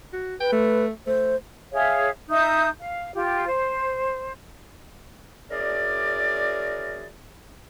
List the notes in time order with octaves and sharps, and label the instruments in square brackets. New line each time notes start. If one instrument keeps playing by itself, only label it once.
[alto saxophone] F#4
[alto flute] B4 [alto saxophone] G5
[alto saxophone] A3
[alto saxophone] A3 [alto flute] C5
[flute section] G#4 C#5 E5 F5
D#4 E5 D#6 G6
F5
F4 G4
C5
[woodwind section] C#4 E4 F#4 G#4 A#4 D5